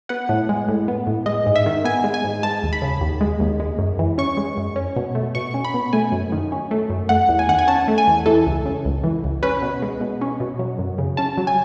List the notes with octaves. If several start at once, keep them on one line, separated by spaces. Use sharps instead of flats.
B3 F#5
A2
G#3
A2
B3
A2
G#3 D#5
G#2
E5
D#3
B3 G#5
G#3
G#5
G#2
G#3 A5
D#2
B5
C#3
D#2
G#3
D#2
G#3
F#2
E3
C#4 C#6
G#3
F#2
C#4
B2
A3
B2 C#6
C#4
B5
B2
A3 G#5
F#2
D#3
C#4
A3
F#2
A3 F#5
E2
G#5
D#3 F#5
G#5
C#4 A5
A3
G#5
E2
E3 A4
C#2
C#3
C#2
E3
C#2
C#4 B4
B2
G#3
B2
C#4
B2
F#3
F#2
C#3
C#4 A5
F#3
G#5